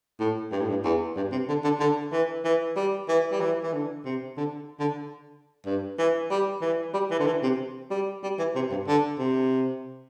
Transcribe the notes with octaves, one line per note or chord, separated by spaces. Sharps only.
A2
G2
A2
G2
E2
G2
C3
D3
D3
D3
E3
E3
G3
E3
G3
E3
E3
D3
C3
D3
D3
G2
E3
G3
E3
G3
E3
D3
E3
C3
G3
G3
E3
C3
G2
D3
C3